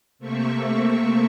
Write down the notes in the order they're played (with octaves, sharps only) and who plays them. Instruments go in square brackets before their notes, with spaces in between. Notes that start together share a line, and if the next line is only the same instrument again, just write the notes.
[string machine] C3 A3 A#3 C4 E5 C#6